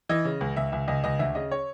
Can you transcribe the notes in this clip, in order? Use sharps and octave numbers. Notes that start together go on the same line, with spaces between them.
E3 D#5
C#3
C#2
C#2 E5
C#2 E5
C#2 D#5
C#2 D#5
D2 E5
C#3 D#5
C#5